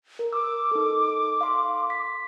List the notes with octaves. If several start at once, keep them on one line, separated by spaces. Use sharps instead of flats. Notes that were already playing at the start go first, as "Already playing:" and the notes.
A#4
D6 E6
D#4 A4
F5 C6
B6